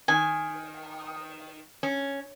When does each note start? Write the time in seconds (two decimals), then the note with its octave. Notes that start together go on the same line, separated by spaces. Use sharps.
0.08 D#3 G#5
1.83 C#4